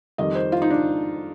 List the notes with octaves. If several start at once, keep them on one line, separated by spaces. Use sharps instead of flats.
F2 D#3 G3 D#5
C5
F4
D#4
D4